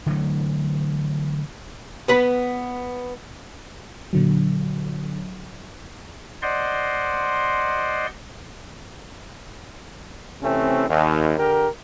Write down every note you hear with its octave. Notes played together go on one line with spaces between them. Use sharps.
D3 E3 F#3 A3
B3 B4 B5
A#2 D3 F#3
C5 D5 D#5 F#5 C6
C3 E3 A3 C4 C#4
D#2
D3 G4 A#4